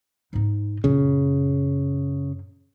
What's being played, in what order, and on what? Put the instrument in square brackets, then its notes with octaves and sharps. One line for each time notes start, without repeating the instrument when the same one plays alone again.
[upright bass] G#2 D#4
[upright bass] F#2 A#2 [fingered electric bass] C#3